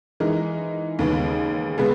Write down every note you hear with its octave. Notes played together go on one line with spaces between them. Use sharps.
E3 G#3 D#4 A#4
D#2 C#3 G#3 B3
C#3 G#3 B3